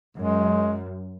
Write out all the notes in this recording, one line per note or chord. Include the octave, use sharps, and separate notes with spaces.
F#2 G#3